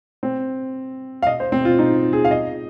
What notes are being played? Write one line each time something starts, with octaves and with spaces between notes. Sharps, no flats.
C4
F5
D#5
C5
C4
F4
D#4
G#4
F5
D#5